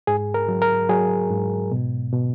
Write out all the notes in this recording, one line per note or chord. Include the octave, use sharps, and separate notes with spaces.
G#2 G#4
A#4
F#3
A#4
F#3 G#4
G#2
B2
B2